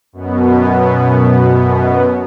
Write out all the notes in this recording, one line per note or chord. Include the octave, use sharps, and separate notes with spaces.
F#2 B2 B3